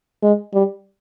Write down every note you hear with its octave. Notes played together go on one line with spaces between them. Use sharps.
G#3
G3